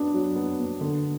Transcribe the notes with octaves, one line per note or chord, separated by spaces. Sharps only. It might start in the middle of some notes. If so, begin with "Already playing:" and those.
Already playing: F#3 B3 D4
F#3
B3
B3
D3